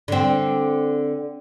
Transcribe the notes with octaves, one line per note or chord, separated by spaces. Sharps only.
D3 C4